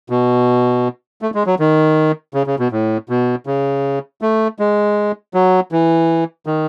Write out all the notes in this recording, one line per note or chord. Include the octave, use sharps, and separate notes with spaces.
B2
A3
G#3
F#3
D#3
C#3
C#3
B2
A2
B2
C#3
A3
G#3
F#3
E3
D#3